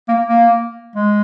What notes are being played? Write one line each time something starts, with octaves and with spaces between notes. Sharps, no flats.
A#3
A#3
G#3